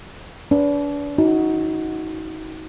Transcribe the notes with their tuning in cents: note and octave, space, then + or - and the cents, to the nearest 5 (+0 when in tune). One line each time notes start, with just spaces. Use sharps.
D4 -35 B4 +0
D#4 +30 F#4 +0